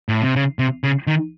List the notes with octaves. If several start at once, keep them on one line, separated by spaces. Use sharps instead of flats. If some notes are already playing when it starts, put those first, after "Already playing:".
A2
C3
C#3
C3
C#3
D#3